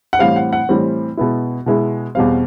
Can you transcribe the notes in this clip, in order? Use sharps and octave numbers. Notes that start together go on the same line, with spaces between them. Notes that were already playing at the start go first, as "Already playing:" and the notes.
F#5
A2 E3 G3 C4 F5
F#5
F#5
A2 E3 G3 C4
B2 G#3 B3 E4
B2 G#3 B3 E4
E2 B2 G3 C4 F5